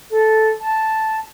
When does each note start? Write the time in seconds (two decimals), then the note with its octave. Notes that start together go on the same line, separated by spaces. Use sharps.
0.10 A4
0.60 A5